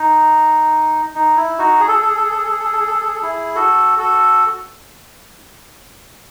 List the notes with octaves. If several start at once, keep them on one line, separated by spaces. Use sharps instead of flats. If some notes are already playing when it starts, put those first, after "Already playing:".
Already playing: D#4
D#4
E4
D#4 F#4
G#4
A4
G#4
A4
G#4
A4
G#4
A4
G#4
A4
G#4
A4
G#4
A4
G#4
A4
G#4
A4
G#4
A4
E4 G#4
F#4 A4
F#4 A4